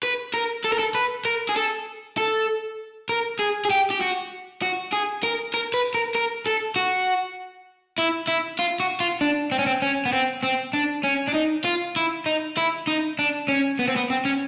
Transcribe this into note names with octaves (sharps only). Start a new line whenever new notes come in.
B4
A#4
A4
A#4
A4
B4
A#4
G#4
A4
A4
A#4
G#4
G#4
G4
G4
F#4
F#4
G#4
A#4
A#4
B4
A#4
A#4
A4
F#4
E4
E4
F4
F#4
F4
D4
C4
C#4
C4
C#4
B3
C4
C4
D4
C#4
D4
D#4
F4
E4
D#4
E4
D#4
D4
C#4
B3
C4
B3
C4
C#4